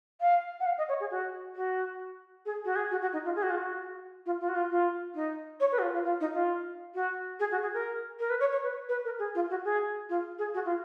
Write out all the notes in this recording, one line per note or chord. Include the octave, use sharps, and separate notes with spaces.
F5
F#5
F5
D#5
C#5
G#4
F#4
F#4
G#4
F#4
G#4
F#4
F#4
D#4
F4
G#4
F#4
F4
F#4
F4
F4
F#4
F4
F4
D#4
C#5
B4
F#4
F4
F4
F4
D#4
F4
F#4
G#4
F#4
G#4
A#4
A#4
B4
C#5
C#5
B4
B4
A#4
G#4
F4
F#4
G#4
F4
G#4
F#4
F4